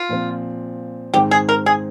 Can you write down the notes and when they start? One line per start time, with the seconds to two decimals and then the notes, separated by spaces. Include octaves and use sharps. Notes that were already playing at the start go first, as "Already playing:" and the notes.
Already playing: F4
0.09 A#2 F3 C4
1.14 G#2 D#3 G#3 C4 D#4 G4
1.31 G#4
1.49 A#4
1.66 G#4